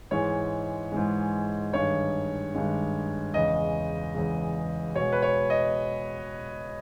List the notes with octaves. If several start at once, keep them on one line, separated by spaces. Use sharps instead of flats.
G#2 E3 G#3 C#5
G#2 E3 G#3
G2 D#3 G#3 C#5
G2 D#3 G#3
E2 C#3 G#3 D#5
E2 C#3 G#3
B2 G#3 C#5
B4
C#5
D#5